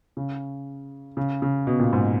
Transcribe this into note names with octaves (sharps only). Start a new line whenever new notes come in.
C#3
C#3
C#3
B2
A#2
G#2